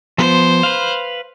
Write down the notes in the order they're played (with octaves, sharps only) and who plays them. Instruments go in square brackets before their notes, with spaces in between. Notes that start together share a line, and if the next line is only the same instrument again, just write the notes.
[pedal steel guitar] F3 B3 [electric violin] C5
[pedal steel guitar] B4 F5